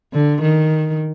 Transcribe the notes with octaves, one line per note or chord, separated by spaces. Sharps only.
D3
D#3